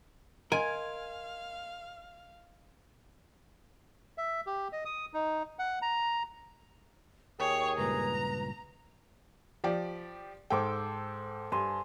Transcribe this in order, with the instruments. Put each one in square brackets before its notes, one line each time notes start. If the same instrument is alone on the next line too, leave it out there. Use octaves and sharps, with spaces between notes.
[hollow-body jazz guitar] A#4 [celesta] D#5 C6 G#6 [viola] F5 [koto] G#5
[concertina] E5
G4
D#5
D#6
D#4
F#5
A#5
[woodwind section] D#2 G#4 [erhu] C#5 [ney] G5
[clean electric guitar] C#2 G2 A#2 [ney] B4 [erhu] A#5
[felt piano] F3 G4 D5
[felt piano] G#2 G5 [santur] A4 C5 D6
[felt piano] G2 [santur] G#5 C6